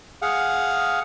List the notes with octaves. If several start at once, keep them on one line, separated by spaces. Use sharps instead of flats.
G#4 F5 F#5